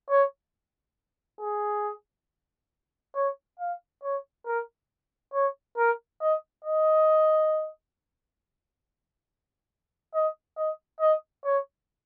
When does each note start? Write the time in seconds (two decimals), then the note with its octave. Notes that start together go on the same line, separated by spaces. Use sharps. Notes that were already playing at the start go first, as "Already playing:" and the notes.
0.10 C#5
1.41 G#4
3.15 C#5
3.60 F5
4.03 C#5
4.46 A#4
5.34 C#5
5.78 A#4
6.21 D#5
6.65 D#5
10.14 D#5
10.57 D#5
11.00 D#5
11.45 C#5